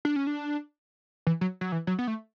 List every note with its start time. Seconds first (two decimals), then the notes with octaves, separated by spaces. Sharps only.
0.05 D4
0.16 C#4
0.27 D4
1.27 E3
1.41 F#3
1.61 F#3
1.72 E3
1.87 F#3
1.99 B3
2.07 A3